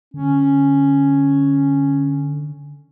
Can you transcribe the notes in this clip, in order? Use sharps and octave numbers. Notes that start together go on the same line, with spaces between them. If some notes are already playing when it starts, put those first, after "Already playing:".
D3 C#4